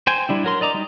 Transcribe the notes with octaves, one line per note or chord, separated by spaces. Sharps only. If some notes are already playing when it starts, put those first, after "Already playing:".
C5 G5 G#5
G3 D4 E4
F#3 A#4 C6
D5 D#5 A#5 D6
G3 D#4